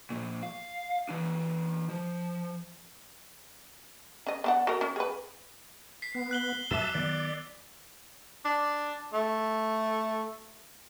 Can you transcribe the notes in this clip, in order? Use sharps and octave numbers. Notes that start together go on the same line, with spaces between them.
A#2 F3
F5
E3 D4
F3
C#4 D#5
B3 D4 F#5
F#4 A#4
C#4
G#4 B4
B6 C7
B3
F#6 F#7 G7
F#2 E5 A5 D6 E6
D#3 F#3 B3 D5
D4
A3